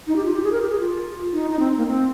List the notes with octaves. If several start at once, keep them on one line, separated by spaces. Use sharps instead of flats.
D#4
G4
F4
G4
G#4
A#4
G4
G#4
F4
D#4
D#4
C4
A#3
C4